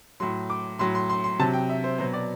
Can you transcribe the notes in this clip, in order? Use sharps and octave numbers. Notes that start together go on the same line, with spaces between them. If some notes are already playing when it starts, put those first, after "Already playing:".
A2 F#3 C6
D6
A2 F#3 C6
C6
C6
C6
C3 F#3 A5
G5
E5
C5
B2 F#3 C5
D5